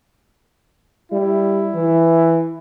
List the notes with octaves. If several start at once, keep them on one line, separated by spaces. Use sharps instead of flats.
G3 E4
E3